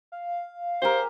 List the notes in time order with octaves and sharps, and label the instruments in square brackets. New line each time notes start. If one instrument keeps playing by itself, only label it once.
[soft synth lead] F5
[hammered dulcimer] G4 G#4 A#4 [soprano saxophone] C5